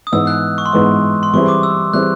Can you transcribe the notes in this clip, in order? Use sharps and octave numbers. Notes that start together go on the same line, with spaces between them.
D#6
G#2 E3 G#3 B3 E6
F#6
C#6
C6
G#2 E3 G#3 B3 C#6
C6
E3 G3 C4 E4 G#4 C#6
D6
E6
E3 G3 C4 E4 G#4 F#6